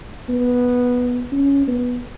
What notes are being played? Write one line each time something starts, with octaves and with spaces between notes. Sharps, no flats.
B3
C#4
B3